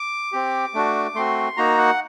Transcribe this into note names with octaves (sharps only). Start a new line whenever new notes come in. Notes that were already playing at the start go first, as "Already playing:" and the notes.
Already playing: D6
C4 G4
A3 D4 F#4
A3 C4 F#4 C6
A#3 D#4 F#4 A#5
F#5